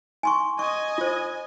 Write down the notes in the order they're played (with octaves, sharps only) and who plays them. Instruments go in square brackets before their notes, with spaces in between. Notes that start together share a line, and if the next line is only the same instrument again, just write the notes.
[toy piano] G#5 C6 C#6
[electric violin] D#5 G#5 [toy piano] C#6
[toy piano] F4 C5